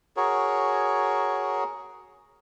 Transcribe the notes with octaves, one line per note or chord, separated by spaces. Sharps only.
F#4 G#4 A#4 C#5